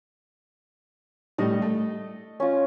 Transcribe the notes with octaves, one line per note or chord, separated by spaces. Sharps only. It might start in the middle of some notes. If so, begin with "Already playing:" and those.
A2 G3 D#5
A3
C#4 F4